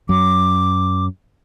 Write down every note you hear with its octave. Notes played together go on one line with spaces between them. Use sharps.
F#2 F#3 D6